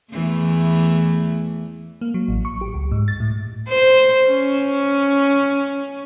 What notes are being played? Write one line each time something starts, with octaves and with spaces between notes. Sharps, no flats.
E2 E3 A3
A#3
F#3
A1
C#6
G4
C#2
G#2
A6
A2
C5
C#4